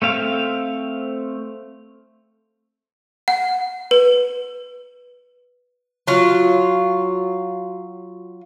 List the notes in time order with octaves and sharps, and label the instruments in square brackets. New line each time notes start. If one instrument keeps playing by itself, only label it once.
[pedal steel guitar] A3 C4 F5
[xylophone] F#5
B4
[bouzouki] F#3 F4